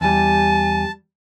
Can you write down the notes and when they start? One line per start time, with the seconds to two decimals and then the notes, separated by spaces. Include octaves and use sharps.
0.01 E2 G3 G#5 A5